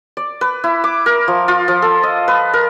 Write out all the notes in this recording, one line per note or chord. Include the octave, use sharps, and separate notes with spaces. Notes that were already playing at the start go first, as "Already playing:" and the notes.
D5
B4
E4
D6
A#4
F3
F4
F3
A4
D#5
B4
A#4